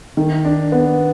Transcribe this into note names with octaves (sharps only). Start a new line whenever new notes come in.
D#3
D4
B3